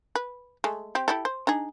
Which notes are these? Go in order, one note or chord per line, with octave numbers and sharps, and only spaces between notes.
B4
G#3 A3
C4 G4
E4 G4 A4
C5
D4 D#4 G#4